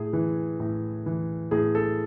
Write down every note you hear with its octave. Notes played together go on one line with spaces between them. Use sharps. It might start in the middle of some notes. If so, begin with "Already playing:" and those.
Already playing: A2 G#4
E3
A2
E3
A2 G#4
A4